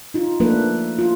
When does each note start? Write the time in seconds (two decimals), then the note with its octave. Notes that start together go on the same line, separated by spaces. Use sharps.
0.14 D#4 F4
0.40 F3 A3 A#3 D4 A4 B4
0.99 F4